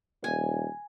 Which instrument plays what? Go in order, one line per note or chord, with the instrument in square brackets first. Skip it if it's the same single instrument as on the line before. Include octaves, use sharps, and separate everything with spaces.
[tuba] D#1 [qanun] G#5